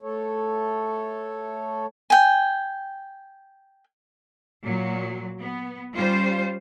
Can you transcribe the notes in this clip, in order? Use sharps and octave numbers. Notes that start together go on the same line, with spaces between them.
A3 A4 C#5
G5 G#5
A#2 F#3
B3
G3 C#4 F4 C5